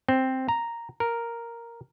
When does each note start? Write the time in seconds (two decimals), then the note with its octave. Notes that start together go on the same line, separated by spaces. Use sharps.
0.09 C4
0.49 A#5
1.00 A#4